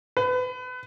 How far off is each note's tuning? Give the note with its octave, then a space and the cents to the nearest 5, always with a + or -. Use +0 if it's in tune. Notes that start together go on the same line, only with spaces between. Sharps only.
B4 +30